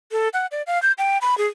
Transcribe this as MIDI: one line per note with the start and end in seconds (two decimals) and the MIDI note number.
0.12 0.29 69
0.33 0.46 78
0.51 0.62 74
0.67 0.81 77
0.82 0.92 91
0.98 1.18 79
1.21 1.38 83
1.38 1.47 68